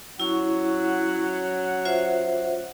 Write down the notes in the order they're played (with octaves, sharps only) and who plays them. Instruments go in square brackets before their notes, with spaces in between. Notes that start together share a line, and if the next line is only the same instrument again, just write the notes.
[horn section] F#3 C#4 F#5 [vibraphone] E4 C#6
[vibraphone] F4 C5 E5